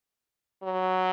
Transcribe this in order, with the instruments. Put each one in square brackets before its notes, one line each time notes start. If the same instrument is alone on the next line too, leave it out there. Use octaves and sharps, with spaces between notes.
[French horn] F#3